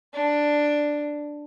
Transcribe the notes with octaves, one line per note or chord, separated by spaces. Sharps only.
D4